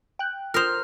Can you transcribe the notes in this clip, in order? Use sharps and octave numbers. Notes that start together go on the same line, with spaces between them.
G5 F#6
F4 A#4 C5 D#6 F6 F7